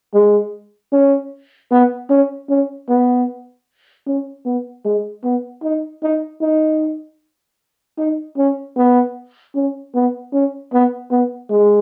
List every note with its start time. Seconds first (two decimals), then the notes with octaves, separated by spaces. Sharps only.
0.14 G#3
0.92 C#4
1.71 B3
2.10 C#4
2.50 C#4
2.89 B3
4.07 C#4
4.45 B3
4.85 G#3
5.24 B3
5.63 D#4
6.03 D#4
6.41 D#4
7.98 D#4
8.38 C#4
8.77 B3
9.56 C#4
9.95 B3
10.33 C#4
10.73 B3
11.11 B3
11.50 G#3